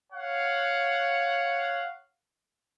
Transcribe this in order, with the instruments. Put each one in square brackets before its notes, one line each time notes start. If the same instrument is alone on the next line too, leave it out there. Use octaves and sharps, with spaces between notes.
[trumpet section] C#5 F5 F#5